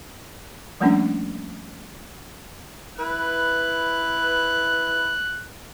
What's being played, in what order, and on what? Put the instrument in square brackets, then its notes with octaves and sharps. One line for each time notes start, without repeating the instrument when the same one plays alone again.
[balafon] F3 G3 A3 A#3 C#4 D4
[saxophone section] E4 B4 [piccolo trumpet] F#6